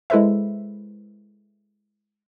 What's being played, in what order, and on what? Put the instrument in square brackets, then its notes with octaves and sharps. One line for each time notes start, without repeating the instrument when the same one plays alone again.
[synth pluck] G#3 E4 A4 B4 C5 E5